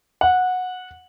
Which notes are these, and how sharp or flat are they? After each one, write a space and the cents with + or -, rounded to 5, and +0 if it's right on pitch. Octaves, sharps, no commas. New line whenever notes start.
F#5 -15